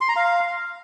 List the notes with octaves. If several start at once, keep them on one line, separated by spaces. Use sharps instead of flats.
C6
A#5
F5